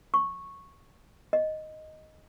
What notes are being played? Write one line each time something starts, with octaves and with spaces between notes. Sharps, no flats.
C#6
D#5